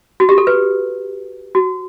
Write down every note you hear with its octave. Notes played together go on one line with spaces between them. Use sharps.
F#4
G4
A4
B4
F#4